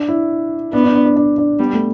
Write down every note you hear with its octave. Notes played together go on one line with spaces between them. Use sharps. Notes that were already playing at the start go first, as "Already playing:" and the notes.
Already playing: D4
E4
B3 D4
D4
D4
D4
D4
D4
G3 B3
A3